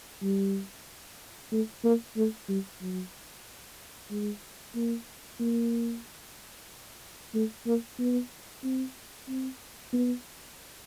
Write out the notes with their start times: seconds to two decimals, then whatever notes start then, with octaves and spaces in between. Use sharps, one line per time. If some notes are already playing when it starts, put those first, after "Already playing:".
0.22 G3
1.52 A3
1.84 A#3
2.17 A3
2.49 G3
2.81 F#3
4.11 G#3
4.75 A#3
5.40 A#3
7.34 A3
7.66 A#3
7.99 B3
8.64 C4
9.28 C4
9.93 B3